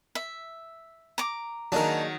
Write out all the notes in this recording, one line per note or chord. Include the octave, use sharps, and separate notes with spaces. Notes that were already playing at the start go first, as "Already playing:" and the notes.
E5
A#5 D6
D#3 F#3 A#3 D4 D#4 G#4 A#4